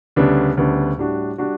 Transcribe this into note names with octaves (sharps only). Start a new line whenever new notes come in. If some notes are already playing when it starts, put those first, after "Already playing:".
D2 C#3 G3 B3 D4
D2 C#3 G3 B3 D4
A2 G3 D4 F#4
G3 D4 F#4